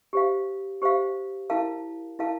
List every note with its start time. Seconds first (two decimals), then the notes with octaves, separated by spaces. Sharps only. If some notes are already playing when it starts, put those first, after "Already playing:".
0.13 G4 C5 F5
0.82 G4 C5 F5
1.50 E4 A#4 F5 A5
2.19 E4 A#4 F5 A5